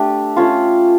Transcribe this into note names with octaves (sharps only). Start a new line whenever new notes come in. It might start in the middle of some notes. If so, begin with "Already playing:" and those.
Already playing: A3 D4 G4
A3 C#4 F4